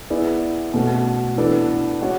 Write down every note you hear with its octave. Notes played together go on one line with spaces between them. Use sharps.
B3 E4 G#4 D5
B2 A3 C#4 F#4
E3 B3 D4 A4
G#3 C#4 F#4 C#5